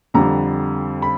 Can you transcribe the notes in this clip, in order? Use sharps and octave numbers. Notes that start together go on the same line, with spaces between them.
F2 D3 G3 A#5
B5